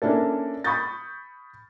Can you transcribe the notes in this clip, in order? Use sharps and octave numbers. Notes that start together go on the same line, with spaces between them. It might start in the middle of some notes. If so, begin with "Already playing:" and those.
A#3 C#4 D4 E4 A4
B5 C#6 D#6 G6 A6